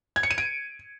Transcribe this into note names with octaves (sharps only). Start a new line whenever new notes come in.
G#6
C#7
D#7
D7